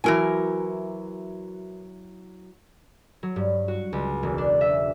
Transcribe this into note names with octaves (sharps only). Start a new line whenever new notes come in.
E3 F#3 E4 F#4 A#4 G#5
F#3
G2
F#4
C#2
E1
D4
E5